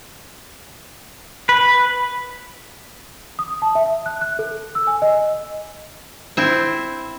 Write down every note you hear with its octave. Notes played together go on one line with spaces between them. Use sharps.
B4
D#6
A5
E5
F#6
F#6
A4
E6
G#5
D#5
C4 E4